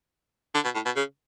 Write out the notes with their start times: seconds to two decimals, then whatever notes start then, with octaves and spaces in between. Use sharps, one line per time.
0.54 D3
0.64 B2
0.75 A2
0.85 B2
0.96 C#3